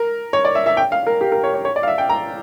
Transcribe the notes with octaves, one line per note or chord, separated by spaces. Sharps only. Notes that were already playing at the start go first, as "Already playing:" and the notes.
Already playing: A#4
C#5
D5
E5
E5
G5
F5
A#4
G4
A#4
C#5
C#5
C#5
D5
F5
E5
G5
A#5